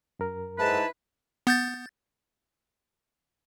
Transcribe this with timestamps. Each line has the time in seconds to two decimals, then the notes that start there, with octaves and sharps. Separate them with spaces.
0.19 F#2 A#4
0.59 G#2 E4 B4 A5
1.47 B3 G6 A6